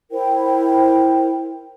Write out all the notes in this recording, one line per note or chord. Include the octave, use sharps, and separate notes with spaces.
E4 A#4 C5 G5